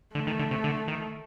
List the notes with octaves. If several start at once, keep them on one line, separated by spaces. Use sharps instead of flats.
D3 A3
D#3
D3
C3
D3
D#3